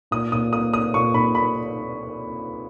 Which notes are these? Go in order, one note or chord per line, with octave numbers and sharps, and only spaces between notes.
A#2 D#6
A#2 D#6
A#3 D#6
A#3 D#6
A#2 C#6
A#2 B5
A#3 B5